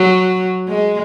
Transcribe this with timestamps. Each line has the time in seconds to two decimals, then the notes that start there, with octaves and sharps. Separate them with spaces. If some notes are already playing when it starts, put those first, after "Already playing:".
Already playing: F#3
0.68 G#3